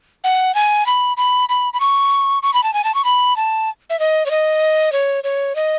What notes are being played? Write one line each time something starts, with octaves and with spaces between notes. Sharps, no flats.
F#5
G#5
B5
B5
B5
B5
C#6
C#6
B5
A5
G#5
A5
C#6
B5
A5
E5
D#5
C#5
D#5
C#5
C#5
D#5